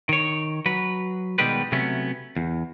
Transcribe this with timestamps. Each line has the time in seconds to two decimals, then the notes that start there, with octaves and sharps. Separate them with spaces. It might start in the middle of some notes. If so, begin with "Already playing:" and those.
0.09 D#3 C#5
0.66 F#3 B4
1.38 B2 D#3 G3 G#3 G4 B4
1.72 C3 F#3 A3 B3 C#4
2.37 E2